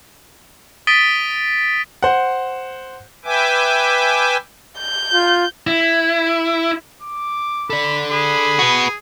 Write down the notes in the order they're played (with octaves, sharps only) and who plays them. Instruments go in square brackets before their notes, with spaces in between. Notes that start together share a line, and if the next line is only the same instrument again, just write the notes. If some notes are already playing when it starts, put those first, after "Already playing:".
[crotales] D#6 A6 B6 D7 D#7 G7
[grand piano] C5 F#5
[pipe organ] B4 E5 G5 G#5 D6
[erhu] G6
[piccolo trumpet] F4
[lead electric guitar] E4
[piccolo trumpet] D6
[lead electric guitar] A4 D5 [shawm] B5
[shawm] G#4 [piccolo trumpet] B5
[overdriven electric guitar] F#4 B4